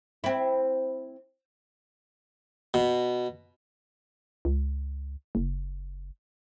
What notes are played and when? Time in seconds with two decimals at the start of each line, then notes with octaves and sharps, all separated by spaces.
0.24 C4 E4
2.74 B2
4.45 C#2
5.35 F#1